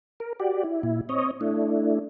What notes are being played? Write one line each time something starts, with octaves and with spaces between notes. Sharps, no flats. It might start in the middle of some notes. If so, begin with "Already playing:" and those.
A#4
F#4 G4 D5
E4
A#2 E4
C4 C#5 D#5
A3 D4 E4